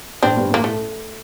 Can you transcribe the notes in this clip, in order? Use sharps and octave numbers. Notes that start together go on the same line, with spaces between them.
A1 A2 C4 D4
G1 G2
A1 A2 A#3
A2 A3